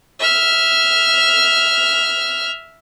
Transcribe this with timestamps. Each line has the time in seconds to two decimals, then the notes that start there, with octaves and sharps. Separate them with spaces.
0.20 E5 F6